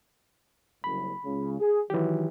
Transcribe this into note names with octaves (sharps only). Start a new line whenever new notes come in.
F#1 C2 B5
C#2 C#3
G#4
D#3 E3 F#3 G4